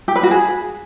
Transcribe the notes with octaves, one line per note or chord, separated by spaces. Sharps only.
G4
B4
F#4
G#4